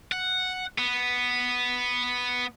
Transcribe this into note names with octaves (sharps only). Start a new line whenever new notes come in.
F#5
B3